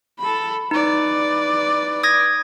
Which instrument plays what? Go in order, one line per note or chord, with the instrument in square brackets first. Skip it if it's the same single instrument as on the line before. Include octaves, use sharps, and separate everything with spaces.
[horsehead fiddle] A4 B5
[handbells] D#4 [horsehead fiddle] B4 D5
[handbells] D#6 G#6 A#6